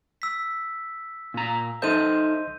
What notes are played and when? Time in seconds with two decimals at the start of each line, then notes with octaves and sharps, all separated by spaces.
0.22 E6 B6
1.34 A#2 A#5
1.82 D#4 A4 C5 D#5 E5 C6 G6 D#7